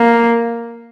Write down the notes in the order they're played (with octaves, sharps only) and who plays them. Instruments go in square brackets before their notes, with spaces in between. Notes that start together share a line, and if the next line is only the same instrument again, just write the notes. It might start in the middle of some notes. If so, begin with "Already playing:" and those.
Already playing: [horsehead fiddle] A#3